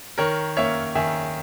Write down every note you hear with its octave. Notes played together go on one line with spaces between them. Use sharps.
D#3 A#4 C#5
A#3 C#4 C#5 E5
D#3 E5 G#5